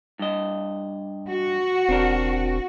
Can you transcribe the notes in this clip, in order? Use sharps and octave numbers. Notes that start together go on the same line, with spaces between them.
G2 D#5
F#4
E1 C4 D4 A#4